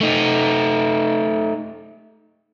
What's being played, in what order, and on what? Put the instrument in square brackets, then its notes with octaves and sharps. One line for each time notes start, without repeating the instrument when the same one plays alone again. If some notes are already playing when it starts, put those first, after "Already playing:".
[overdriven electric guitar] A3 D#4